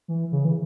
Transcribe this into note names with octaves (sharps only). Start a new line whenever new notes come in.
E3
C#3
E3